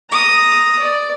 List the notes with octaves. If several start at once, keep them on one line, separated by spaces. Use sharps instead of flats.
A#5 D#6
D5